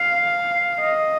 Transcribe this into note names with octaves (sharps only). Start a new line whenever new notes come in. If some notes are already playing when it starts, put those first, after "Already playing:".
Already playing: F5
D#5